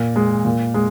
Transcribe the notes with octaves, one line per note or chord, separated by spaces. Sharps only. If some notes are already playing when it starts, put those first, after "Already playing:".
Already playing: A#2
G#3
A#2
G#3